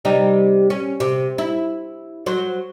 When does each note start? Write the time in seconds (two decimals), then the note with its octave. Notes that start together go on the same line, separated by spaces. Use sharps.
0.05 C3 G3 D#4
0.70 C#4
1.00 C3
1.38 E4
2.26 F#3 C5